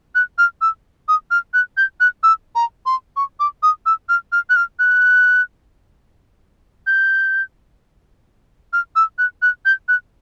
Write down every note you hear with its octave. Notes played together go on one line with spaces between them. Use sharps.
F#6
F6
E6
D#6
F6
F#6
G6
F#6
E6
A#5
C6
C#6
D6
D#6
E6
F6
F6
F#6
F6
F#6
G6
F6
E6
F#6
F#6
G6
F#6